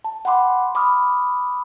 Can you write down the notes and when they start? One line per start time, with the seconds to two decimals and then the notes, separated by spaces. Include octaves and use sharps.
0.04 A5
0.25 F#5 G5 B5 C6 D6
0.75 B5 D6 D#6 F6